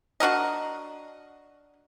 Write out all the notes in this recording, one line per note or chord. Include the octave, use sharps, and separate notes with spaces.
D4 F#4 A#4 D#5